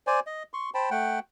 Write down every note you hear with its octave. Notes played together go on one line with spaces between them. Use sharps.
C5 D5 G#5
D#5
C6 C#6
C5 G5 A5 B5
A3 F#5 G5